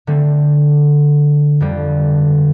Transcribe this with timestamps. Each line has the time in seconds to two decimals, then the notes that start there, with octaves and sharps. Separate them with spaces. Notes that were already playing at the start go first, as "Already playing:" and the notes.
0.07 D3 A3 C4
1.60 F2 D3 G3